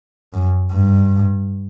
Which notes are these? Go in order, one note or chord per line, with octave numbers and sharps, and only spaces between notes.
F#2
G2